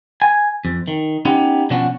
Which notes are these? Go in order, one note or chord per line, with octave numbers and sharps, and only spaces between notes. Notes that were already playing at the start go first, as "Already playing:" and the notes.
G#5
F2
D#3
B3 C#4 D#4 G4
B2 F3 C#4 D4 F#4